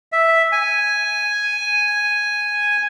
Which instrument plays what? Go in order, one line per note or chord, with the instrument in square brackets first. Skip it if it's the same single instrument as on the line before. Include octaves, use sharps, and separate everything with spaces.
[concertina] E5
G#5